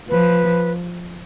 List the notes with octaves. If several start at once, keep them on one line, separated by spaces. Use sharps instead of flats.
F3 B4